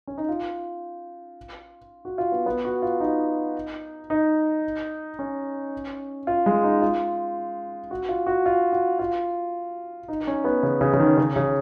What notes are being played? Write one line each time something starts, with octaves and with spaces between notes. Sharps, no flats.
C#4
D#4
F4
F#4
F4
B3
B3
F#4
F4
D#4
D#4
C#4
F4
G#3
D#4
F4
F#4
F4
F#4
F4
F#4
F4
D#4
D#4
C#4
B3
C#3
C#3
C#3
D#3
C#3
C#3